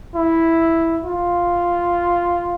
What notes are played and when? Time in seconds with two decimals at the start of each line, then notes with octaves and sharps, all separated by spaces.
0.15 E4
1.05 F4